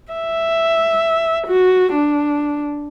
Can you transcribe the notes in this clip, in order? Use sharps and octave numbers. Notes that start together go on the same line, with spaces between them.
E5
F#4
D4